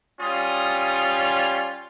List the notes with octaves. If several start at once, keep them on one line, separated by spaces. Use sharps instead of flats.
G3 C#4 F4 D#6